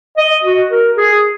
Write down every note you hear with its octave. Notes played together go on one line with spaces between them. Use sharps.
D#5
F#4
A#4
G#4